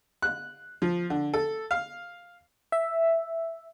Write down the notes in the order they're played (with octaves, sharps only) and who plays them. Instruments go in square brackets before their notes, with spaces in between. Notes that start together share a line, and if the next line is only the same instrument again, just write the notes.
[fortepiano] F#6
F3
D3
A4
F5
[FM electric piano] E5